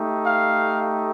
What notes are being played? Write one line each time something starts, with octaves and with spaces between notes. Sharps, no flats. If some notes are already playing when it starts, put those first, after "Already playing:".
Already playing: A3 D#4 G4
F5